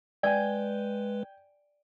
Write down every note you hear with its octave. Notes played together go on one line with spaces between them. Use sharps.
G#3 B4 D5 G5 G#5